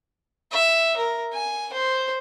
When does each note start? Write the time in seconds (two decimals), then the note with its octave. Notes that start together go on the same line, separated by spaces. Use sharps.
0.51 E5
0.97 A#4
1.33 G#5
1.73 C5